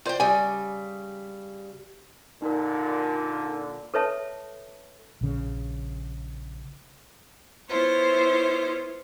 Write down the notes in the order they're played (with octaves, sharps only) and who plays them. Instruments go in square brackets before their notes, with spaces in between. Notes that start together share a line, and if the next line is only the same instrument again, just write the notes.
[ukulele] F4 C5 [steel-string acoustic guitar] D5 G5
[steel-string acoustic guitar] C#3 G3 [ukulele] D5 G#5
[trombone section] A#2 D3 [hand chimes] D#4 A#4
[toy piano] A4 B4 C#5 E5 A5
[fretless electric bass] A#1 C#3
[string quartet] B3 E4 F4 C5 C#5